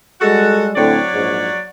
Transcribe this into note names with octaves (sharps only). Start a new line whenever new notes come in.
G3 G#3 F#4 A4
A2 D3 F#3 C4 C#5 D5
A#1 G#2